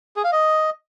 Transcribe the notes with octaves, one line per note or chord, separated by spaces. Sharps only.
G#4
F5
D#5